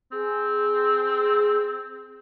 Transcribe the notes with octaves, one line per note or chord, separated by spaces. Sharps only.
C4 G#4